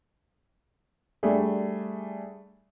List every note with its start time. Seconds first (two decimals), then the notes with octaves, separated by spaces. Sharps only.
1.23 G3 A3 D4 G#4